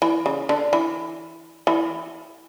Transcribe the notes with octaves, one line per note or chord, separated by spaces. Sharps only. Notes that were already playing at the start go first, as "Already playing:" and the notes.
E3
C#3
D3
E3
E3